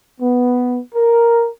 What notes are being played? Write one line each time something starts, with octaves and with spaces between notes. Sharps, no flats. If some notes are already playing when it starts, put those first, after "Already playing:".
B3
A#4